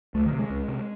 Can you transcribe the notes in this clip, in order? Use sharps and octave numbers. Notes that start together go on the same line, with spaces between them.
C#2 A3
D#3
C3
G#3
C#2
C3